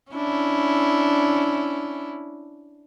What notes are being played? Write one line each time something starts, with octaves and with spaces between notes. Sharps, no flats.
C#4 D4 E4